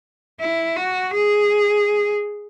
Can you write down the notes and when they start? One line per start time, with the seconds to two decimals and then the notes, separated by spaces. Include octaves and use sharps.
0.41 E4
0.76 F#4
1.13 G#4